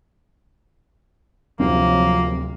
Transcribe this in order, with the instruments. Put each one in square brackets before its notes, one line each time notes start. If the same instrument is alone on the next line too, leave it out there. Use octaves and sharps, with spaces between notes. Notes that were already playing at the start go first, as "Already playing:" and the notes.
[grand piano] D1 C3 [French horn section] F3 F#3 [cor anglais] A#3 [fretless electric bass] C4